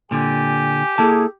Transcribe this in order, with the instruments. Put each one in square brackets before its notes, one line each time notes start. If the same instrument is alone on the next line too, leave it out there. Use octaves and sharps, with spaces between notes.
[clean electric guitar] A#2 D3 [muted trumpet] G4 [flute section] G#5
[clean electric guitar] A#3 E4 A5 [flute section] G#4 A4